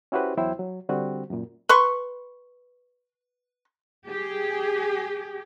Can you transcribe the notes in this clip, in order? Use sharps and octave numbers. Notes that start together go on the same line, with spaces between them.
C#4 E4 F#4 G4 B4 C5
E2 F#3 E4 C5 G5
F#3
D3 G3 C4 F#4
F#2 A#2
B4 C6 C#6
G4 G#4